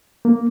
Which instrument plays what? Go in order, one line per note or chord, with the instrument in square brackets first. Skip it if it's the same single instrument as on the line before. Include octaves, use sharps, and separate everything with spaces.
[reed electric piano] A#3